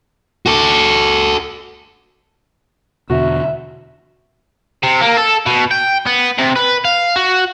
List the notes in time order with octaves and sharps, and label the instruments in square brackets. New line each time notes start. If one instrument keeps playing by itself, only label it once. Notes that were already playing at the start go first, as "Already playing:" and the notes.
[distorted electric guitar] F#4 A4
[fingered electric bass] E2 B2 D3 [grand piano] F#4 [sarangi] E5
[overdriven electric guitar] C3
A#3
A4
B2
G5
B3
C3
B4
F5
F#4